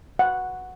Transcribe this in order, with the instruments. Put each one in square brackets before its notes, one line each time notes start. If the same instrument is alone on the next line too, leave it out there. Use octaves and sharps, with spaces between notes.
[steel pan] F#5